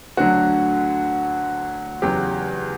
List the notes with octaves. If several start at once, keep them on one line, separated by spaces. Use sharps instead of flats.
D2 D3 F#3 F#4
E2 C#3 F#3 G4